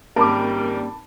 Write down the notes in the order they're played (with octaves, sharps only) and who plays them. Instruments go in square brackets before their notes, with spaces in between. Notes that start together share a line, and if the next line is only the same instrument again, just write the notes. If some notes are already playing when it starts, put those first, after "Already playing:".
[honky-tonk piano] G#1 A#4 [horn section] G3 [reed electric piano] A#3 C#4 [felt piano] A5 B5 D6